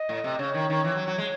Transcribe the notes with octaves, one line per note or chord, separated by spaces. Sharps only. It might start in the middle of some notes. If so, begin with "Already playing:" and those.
Already playing: D#5
A2
C3
C#3 C#5
D#3
D#3
E3
F#3
F#3
G#3